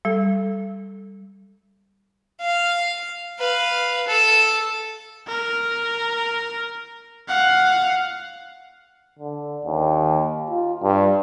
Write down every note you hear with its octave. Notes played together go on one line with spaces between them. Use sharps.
G3 A4
F5
B4 F5
A4
A#4
F5 F#5
D3
D#2
F4
G2